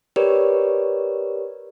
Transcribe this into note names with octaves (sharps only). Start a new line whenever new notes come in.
G4 A#4 B4 C#5 D5